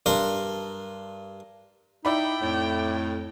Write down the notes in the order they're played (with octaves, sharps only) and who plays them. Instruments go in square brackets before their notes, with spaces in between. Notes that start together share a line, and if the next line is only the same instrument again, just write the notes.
[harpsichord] G2 D4 A#4 C6
[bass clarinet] D#4 [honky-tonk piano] E4 D5 B5 [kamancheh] G5
[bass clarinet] F2 [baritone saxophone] A2